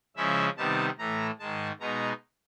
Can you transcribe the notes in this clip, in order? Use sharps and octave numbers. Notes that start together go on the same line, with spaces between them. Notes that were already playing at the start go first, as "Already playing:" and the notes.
C#3 F3 G#3 C#4 E4 E5
C3 D#3 G3 B3 D#4 A5
A2 E3 A3 A#5
G#2 D#3 G#3 A5
B2 G#3 B3 D#4 A#5